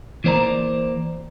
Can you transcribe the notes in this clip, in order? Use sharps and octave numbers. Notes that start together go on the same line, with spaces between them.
E3 A#3 C5 D5 A#5